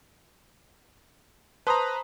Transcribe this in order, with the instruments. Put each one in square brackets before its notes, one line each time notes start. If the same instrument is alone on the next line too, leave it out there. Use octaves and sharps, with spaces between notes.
[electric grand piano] B4 C5 A#5 [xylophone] A5 C6 D#6